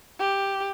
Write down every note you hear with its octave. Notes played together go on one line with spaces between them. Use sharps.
G4